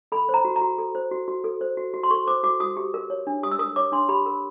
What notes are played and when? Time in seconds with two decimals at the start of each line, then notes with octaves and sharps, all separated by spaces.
0.12 A4 B5
0.29 C5
0.34 A#5
0.45 F#4
0.56 A#5
0.61 F#4
0.78 A4
0.95 C5
1.11 F#4
1.28 F#4
1.44 A4
1.61 C5
1.77 F#4
1.94 F#4
2.03 C6
2.10 A4 C#6
2.27 C5 D6
2.43 F#4 D6
2.60 F#4 D#6
2.77 G4
2.94 A#4
3.10 C#5
3.27 D4
3.43 G4 D#6
3.52 E6
3.59 A#4 D#6
3.76 C#5 D6
3.92 D4 C6
4.09 G4 B5
4.26 A#4